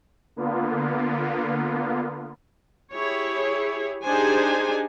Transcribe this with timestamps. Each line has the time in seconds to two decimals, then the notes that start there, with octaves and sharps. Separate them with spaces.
0.36 D3 A#3 B3 F4
2.93 E4 G4 G#4 C#5
4.05 D4 D#4 G4 G#4 C5 G#5